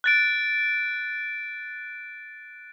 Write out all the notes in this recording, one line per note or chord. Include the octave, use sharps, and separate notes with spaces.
F#6 A6 D7